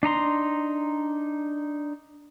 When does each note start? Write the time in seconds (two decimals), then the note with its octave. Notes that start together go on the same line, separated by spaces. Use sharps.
0.03 D4 D#4 A#5 C6